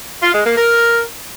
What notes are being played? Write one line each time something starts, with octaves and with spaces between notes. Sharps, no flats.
F4
G#3
A#3
A#4